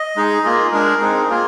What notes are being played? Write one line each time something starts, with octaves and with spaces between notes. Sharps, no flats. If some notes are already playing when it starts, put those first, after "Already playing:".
Already playing: D#5
G#3 D#4 G#4
A#3 F4 G#4
G#3 D4 G#4 A#4
G#3 C4 D#4 G#4
A#3 F4 G#4